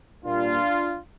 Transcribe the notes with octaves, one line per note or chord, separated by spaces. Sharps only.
A#2 G3 A#3 D4 F4